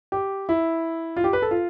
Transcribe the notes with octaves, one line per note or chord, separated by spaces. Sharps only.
G4
E4
F4
G4
B4
A4
F4